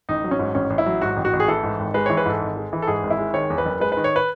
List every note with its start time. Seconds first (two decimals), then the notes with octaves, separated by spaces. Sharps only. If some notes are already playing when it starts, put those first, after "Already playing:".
0.09 A1 D#4
0.24 F#3
0.31 C#4
0.39 G#2
0.55 A1 C#4
0.70 A1
0.78 E4
0.86 F#3
1.02 G#2 F#4
1.17 A1
1.25 F#4
1.33 A1
1.40 G#4
1.48 E3 A4
1.63 G#2
1.79 G#1
1.94 G#3 B4
2.06 E3 C#5
2.17 B4
2.26 G#2 A4
2.41 G#1
2.56 G#3
2.73 E3
2.82 A4
2.87 G#2 G#4
3.03 G#1
3.10 E4
3.18 G#3
3.34 D#3 C#5
3.50 E2
3.58 B4
3.66 F#1
3.80 G#3 B4
3.92 D#3 B4
4.04 C#5
4.16 B4